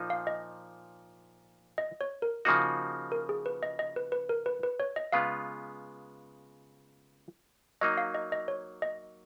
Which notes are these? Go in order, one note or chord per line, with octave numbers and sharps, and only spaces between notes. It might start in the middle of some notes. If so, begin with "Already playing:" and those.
Already playing: A#2 F3 A#3 D#4
F5
D#5
D#5
C#5
A#4
C#3 F3 A#3 D#4 F#4
A#4
G#4
B4
D#5
D#5
B4
B4
A#4
B4
B4
C#5
D#5
C#3 G#3 B3 F4 B4 F5
F#3 A#3 D#4 D#5
F5
D#5
D#5
C#5
D#5